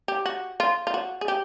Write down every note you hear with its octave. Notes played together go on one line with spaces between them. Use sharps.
G4
F#4
F4
F4
F#4
G#4
G4